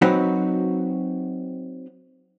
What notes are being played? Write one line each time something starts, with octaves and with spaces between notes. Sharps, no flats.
F#3 C4 D#4 F#4 B4